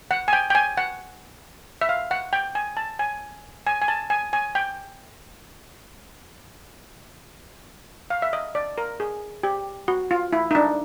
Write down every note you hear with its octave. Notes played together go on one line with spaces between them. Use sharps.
F#5
G#5
G5
G5
G#5
F#5
E5
F5
F#5
G5
G#5
A5
G#5
G#5
G#5
A5
G#5
G#5
G5
F5
E5
D#5
D5
A#4
G#4
G4
F#4
F4
E4
D#4
D4